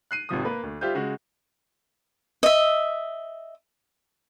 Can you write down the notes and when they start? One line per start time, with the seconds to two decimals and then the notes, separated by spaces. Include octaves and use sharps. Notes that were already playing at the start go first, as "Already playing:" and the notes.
0.11 F#6 C7 D#7
0.29 G#1 C3 F3 D#6
0.45 A#3 B4
0.63 D2
0.81 G3 F4 G4 C5 E5 G6
0.94 C#3 G#3 F#4
2.43 D#5 E5